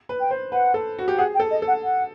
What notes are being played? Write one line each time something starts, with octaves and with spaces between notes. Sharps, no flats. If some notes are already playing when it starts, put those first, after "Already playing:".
B4
G5
C5
B4 F#5
A4
F#4
G4
G#4 F#5
G5
A4
D#5
A4
F#5
F#5